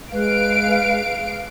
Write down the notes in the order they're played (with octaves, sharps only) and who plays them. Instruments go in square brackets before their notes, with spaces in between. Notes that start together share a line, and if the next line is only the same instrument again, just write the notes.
[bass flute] G#3 [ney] B4 [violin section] F5 D7